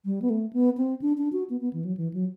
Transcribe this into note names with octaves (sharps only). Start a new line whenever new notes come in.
G3
B3
A3
B3
C4
D4
D4
F#4
B3
B3
E3
F#3
E3
F#3